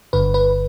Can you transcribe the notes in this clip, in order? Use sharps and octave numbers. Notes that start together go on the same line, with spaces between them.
G1 G2 D3 B4
B4